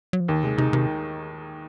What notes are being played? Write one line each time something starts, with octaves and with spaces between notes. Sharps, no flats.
F#3
F3
D#2 D#3
C3 G#3
C3 D#4
C3 D#3